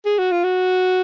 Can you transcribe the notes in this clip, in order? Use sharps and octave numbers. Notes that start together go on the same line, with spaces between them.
G#4
F#4
F4
F#4